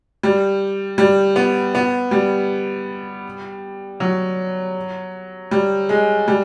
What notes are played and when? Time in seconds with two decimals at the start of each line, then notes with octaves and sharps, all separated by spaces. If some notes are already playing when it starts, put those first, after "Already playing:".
0.23 G3
0.98 G3
1.36 B3
1.75 B3
2.11 G3
4.00 F#3
5.51 G3
5.89 G#3
6.28 G3